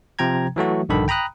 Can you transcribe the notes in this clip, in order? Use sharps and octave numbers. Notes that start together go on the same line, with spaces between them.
C3 F3 G5 A#5 G#6
E3 F#3 A3 F#4
A#1 G2 D3 D#3 A4 B5
G5 A#5 B5 D#6 F#6